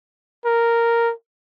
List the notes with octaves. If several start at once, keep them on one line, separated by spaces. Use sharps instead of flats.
A#4